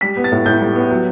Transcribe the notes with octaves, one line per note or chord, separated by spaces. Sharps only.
G3 B6
B3
A6
A2
A2 G6
G3
B3
F#3